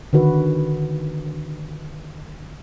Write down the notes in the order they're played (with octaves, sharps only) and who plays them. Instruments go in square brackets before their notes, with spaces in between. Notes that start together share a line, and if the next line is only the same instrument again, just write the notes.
[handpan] D3 D#3 F#4 B4